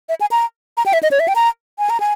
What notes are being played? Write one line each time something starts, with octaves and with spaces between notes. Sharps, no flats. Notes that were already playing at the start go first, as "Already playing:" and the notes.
E5
G#5
A#5
A#5
G5
E5
D#5
C#5
E5
G5
A#5
G#5
A#5
G#5